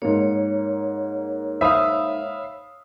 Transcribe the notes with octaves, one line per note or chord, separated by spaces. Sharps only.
G#2 A#3 C#5
C5 E5 F5 B5 D#6